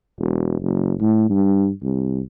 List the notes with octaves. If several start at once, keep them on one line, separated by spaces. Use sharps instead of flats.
E1
F#1
A2
G2
C2